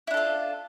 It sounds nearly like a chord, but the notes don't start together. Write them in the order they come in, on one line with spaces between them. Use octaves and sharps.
E4 D4 A4 F4